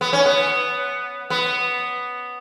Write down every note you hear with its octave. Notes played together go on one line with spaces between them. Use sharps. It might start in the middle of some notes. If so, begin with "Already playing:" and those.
B3
C#4
B3
B3